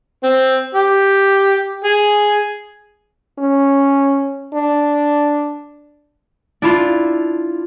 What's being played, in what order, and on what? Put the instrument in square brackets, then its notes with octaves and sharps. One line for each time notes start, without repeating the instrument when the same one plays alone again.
[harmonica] C4
G4
G#4
[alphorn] C#4
D4
[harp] D4 E4 F4